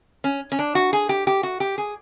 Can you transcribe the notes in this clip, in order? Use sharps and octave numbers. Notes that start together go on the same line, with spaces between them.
C#4
C#4
D4
F#4
G#4
G4
G4
F#4
G4
G#4